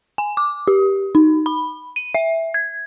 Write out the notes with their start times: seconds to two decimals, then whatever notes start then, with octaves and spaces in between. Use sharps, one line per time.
0.18 G#5
0.37 D6
0.68 G4
1.15 D#4
1.46 B5
1.96 D#7
2.14 E5
2.54 G#6